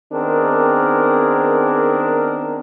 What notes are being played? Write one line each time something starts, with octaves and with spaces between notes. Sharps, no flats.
D#3 B3 C4 D4 G#4 A#4